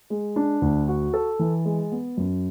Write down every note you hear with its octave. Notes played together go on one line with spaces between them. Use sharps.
G#3
D4
D2
F#4
A4
E3
G#3
B3
F#2